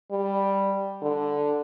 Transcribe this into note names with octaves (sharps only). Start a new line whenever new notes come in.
G3
D3